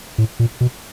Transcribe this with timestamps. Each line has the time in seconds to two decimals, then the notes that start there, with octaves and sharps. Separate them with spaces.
0.18 A2
0.39 A#2
0.61 B2